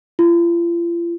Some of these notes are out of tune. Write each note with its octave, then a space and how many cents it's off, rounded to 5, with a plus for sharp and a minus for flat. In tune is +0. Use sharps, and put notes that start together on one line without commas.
F4 -40